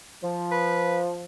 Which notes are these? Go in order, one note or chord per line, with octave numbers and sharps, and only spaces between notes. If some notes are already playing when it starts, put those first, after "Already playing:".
F3
B4